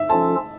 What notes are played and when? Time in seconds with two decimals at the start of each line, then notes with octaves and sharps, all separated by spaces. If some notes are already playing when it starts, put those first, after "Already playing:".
Already playing: E5
0.09 F3 C#4 F4 A4 A5